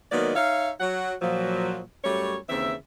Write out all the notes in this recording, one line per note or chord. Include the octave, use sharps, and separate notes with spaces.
D#3 F#3 G#3 A#3 B3 D5
D#4 C#5 E5 F5
F#3 F#5
A#2 F3 F#3
F#2 G3 A3 C#5
D#2 C#3 E3 C4 E5